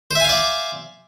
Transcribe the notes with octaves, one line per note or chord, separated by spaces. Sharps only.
C5 D5 E5 F5 G#5